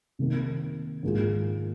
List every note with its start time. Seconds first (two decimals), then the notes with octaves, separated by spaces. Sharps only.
0.19 C3 D#3 A#3
1.03 G#2 D#3 A#3 F4 G#4